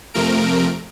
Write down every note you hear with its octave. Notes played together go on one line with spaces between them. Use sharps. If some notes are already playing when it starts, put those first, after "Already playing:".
F2 C3 F3 A3 A#4 D7